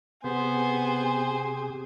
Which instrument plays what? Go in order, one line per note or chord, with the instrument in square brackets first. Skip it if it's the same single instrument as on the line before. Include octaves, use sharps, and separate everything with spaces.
[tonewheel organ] C3 G4 G#4 [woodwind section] B3 [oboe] C5 [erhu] G#5